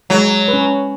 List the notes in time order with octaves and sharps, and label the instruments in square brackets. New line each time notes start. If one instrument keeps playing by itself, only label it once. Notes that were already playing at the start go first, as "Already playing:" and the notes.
[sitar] F#3 [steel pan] G#3
[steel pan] B4
C#4